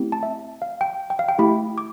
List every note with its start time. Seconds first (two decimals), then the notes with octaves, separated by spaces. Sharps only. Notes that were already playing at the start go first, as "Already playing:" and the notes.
Already playing: A3 C4 E4 G4
0.12 A5
0.23 E5
0.62 F5
0.81 G5
1.10 G5
1.19 F5
1.29 G5
1.39 A3 E4 G4 B5
1.78 D6